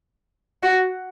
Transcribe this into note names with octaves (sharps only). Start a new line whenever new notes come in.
F#4